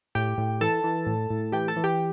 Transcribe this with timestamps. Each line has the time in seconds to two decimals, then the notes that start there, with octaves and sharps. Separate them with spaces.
0.15 A2 G4 G5
0.38 A2
0.61 E3 A4 A5
0.84 E3
1.07 A2
1.30 A2
1.52 E3 G4 G5
1.68 A4 A5
1.76 E3
1.84 G4 G5